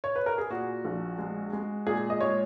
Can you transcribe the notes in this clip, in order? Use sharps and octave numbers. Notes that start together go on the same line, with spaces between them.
C#5
B4
A#4
G#4
A#2 F#4
A#1
G#3
G#3
A#2 G#4
D#5
G#3 C#5